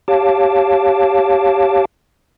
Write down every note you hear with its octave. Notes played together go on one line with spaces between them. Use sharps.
G4 C#5 F5 A5 D6